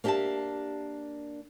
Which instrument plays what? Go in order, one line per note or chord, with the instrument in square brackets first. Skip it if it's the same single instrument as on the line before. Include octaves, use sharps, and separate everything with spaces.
[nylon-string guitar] A#3 D4 G4 D#5 E5 A5